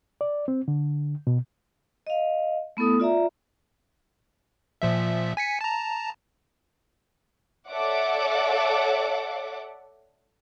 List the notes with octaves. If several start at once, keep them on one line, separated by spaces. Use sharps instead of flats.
D5
C4
D3
B2
D#5 F5
A3 B3 E4 A4 D#6
F4 D5 E5 A#5
A#2 F3 E5
G#5 B6 C#7
A5 A#5
A4 C#5 D5 E5 F#5 D6